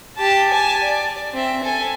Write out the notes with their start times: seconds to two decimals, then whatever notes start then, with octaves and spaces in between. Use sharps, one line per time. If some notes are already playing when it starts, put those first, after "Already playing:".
0.17 G4 A5
0.49 G#5 A5
0.83 D5
1.34 C4 E5
1.63 A4 G#5